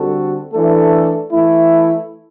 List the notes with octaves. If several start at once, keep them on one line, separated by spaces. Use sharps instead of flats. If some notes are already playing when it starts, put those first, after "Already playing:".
Already playing: D3 G3 C4 F#4 A4
E3 A3 D4 A4
E3 A3 E4